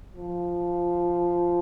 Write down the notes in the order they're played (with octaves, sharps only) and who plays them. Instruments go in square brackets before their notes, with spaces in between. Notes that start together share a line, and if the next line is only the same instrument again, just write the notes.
[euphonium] F3